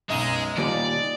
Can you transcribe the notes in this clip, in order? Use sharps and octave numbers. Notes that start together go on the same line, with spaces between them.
B1 F#2 G#3 D#4 D#7
D#2 A#2 G3 D5